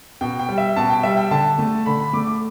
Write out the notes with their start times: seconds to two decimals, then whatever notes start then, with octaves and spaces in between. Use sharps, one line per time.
0.21 B2 G5
0.39 G5
0.49 G3
0.58 E5
0.76 B2 A5
0.90 G5
1.03 G3 E5
1.17 G5
1.31 D3 A5
1.59 A3
1.86 D3 B5
2.00 B5
2.13 A3 D6
2.27 D6